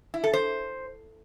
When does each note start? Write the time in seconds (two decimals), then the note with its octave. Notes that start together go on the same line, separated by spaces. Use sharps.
0.14 E4
0.24 A4
0.33 C5